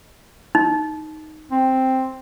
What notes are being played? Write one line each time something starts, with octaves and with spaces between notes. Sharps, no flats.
D#4
C4